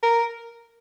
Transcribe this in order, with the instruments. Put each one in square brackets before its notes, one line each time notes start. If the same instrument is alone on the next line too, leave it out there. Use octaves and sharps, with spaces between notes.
[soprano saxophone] A#4